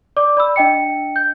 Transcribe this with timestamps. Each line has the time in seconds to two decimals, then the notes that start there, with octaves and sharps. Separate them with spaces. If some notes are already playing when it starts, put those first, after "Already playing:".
0.17 D5 D6
0.37 D5 B5 E6
0.56 D4 D#5 G5 C#7
1.16 G6